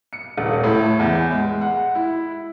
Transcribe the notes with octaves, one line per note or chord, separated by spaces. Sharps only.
C#7
D#1
A2
E2
G#3
F#5
E4